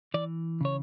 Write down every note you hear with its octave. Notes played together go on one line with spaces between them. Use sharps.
E3 D5
C#3 C#5